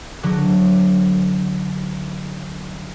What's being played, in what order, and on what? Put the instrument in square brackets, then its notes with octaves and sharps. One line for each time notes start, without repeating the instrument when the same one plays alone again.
[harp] D3 F#3